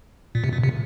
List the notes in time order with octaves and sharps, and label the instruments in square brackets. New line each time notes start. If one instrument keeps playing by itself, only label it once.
[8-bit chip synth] A#2
C3
A#2
C3